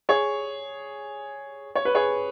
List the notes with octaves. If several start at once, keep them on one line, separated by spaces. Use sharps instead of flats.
G#4 C#5
C#5
B4
G#4 C#5